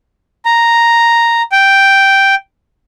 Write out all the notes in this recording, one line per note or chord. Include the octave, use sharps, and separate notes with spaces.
A#5
G5